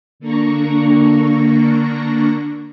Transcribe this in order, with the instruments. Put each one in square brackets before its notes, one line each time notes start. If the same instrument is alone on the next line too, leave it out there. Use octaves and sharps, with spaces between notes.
[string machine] D3 A#3 D4 A#5 C#6